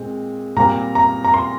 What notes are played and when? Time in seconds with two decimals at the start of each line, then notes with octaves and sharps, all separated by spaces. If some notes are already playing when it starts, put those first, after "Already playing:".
Already playing: A#2 G#3 C4
0.56 A#2 G3 C4 A#5
0.95 A#5
1.25 A#5
1.34 C6